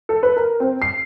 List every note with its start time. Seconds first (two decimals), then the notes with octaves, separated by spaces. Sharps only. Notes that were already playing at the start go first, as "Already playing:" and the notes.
0.09 A4
0.23 B4
0.37 A#4
0.60 C4
0.82 C7